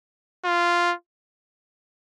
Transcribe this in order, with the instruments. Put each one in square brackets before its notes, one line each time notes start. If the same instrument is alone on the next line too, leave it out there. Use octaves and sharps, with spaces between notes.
[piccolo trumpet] F4